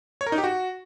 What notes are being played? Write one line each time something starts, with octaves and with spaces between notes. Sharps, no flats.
C#5
A#4
D#4
G4
F#4